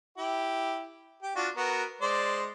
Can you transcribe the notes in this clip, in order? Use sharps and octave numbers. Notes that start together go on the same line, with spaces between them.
E4 G4
G4
D4 F4 F#4
B3 F#4 A#4
G#3 C5 D5